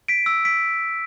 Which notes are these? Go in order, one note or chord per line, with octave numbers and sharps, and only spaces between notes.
B6 D7
E6
B6 D7